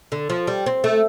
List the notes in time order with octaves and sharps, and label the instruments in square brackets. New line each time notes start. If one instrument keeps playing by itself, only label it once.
[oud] D3
F3
G3
C4
A3